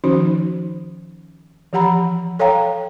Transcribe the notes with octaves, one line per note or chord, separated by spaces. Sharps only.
D#3 F3 C#4 D#4 F#4 C5
E3 F3 G4 F#5 A#5 B5
A4 C#5 F5 G5 A#5